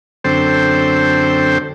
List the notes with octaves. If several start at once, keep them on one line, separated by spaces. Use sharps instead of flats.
F#2 D3 C4 A4 C5 G5